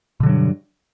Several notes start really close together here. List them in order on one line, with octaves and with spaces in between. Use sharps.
B2 D3 F#3 G2